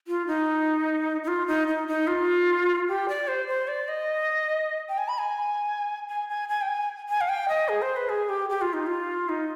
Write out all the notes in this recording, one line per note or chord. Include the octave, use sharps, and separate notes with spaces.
F4
D#4
D#4
F4
D#4
D#4
D#4
F4
G4
D5
C5
C5
D5
D#5
G5
G#5
B5
G#5
G#5
G#5
G#5
G5
G#5
G#5
F5
G5
D#5
G#4
C5
B4
G#4
G4
G4
F4
D#4
F4
D#4